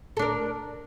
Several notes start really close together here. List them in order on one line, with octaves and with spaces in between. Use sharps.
A4 D4 A#4